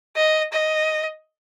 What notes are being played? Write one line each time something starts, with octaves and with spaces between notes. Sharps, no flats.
D#5
D#5